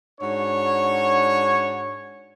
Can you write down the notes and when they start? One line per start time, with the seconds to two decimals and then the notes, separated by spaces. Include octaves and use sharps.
0.21 G#2 D4 F#4 C#5